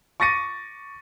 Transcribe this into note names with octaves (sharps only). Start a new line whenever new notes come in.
C#6 D6 A6 A#6 C#7 D#7